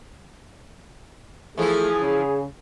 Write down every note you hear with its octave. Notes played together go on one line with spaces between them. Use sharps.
E3 F3 A3 E4 G#4
C#3